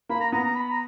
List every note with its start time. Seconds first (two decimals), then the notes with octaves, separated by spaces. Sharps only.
0.09 A#3 B5
0.20 A#5
0.32 B3 A#5
0.44 A#5
0.56 B5
0.71 A#5